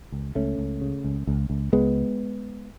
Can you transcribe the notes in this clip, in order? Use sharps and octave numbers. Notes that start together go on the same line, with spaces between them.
C#2
C#2 A3 C#4
C#2
C#3
C#2
C#2
C#2
C#2 G#3 B3